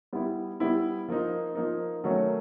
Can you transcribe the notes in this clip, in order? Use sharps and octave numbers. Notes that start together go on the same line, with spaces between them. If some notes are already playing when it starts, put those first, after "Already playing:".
G3 B3 E4
G3 B3 E4
F3 A#3 D#4
F3 A#3 D#4
D#3 F#3 A3 C#4 F#4